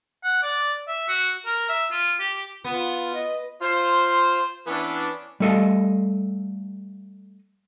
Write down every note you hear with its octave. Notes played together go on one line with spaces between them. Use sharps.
F#5
D5
E5
F#4
A#4
E5
F4
G4
B3 F4
D#5
F4 C5
E3 B3 C#4 D4 E4
G3 A3 A4 D#5 F5